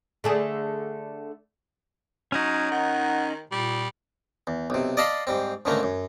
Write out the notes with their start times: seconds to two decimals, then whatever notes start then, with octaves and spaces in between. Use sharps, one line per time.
0.24 D3 A3 G#4
2.32 F#3 C#4 D#4
2.71 D#3 F#5
3.51 A#2 G3
4.47 E2
4.70 B1 C3
4.97 D5 D#5 F5 A5 B5 C6
5.27 G#2 G3 C4
5.65 C#2 G#2 D3 A3 A#3
5.83 F#2